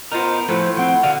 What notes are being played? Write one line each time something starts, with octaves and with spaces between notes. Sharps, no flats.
B3 D#4 F4 A#4 C5
A2 F3 A3 F4 B4 C5
F3 C4 F#5
D3 F#4 F5